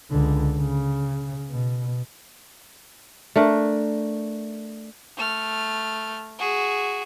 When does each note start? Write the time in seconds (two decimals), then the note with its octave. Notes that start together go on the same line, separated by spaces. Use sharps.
0.10 C#2 D3
0.58 C#3
1.50 B2
3.36 A3 D4 A#4
5.17 A3 F6
6.39 F#4 G#4